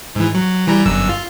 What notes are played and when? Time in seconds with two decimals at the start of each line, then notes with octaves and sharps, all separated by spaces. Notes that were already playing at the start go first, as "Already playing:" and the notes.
0.15 G#2 E3
0.34 F#3
0.67 E3 G3 A#5
0.86 G1 F#2 E6
1.09 F4